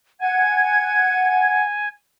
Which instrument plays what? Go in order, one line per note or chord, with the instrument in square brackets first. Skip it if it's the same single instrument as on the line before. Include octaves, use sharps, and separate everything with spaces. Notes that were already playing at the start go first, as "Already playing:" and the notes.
[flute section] F#5 G#6 [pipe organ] G#5